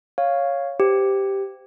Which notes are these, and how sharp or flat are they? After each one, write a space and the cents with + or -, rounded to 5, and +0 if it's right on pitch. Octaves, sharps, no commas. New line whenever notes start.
C#5 +0 F5 +0
G4 +0 C5 -25